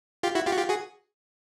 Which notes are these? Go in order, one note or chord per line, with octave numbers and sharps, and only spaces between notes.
F4 G4
E4 F#4
F4 G4
F#4
F4 G4
F#4 G#4